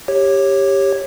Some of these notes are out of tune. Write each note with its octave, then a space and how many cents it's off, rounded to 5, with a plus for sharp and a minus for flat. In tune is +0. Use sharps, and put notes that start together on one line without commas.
G4 +10 C#5 -15